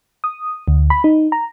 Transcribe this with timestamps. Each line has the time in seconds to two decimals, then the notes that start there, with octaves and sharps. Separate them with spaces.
0.24 D#6
0.68 D2
0.90 B5
1.04 D#4
1.32 A#5